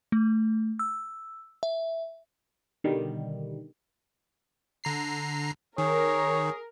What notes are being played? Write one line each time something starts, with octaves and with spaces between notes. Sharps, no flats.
A3
E6
E5
B2 D3 D#3 G3
D3 A#5 C7
D#3 G#4 A#4 C#5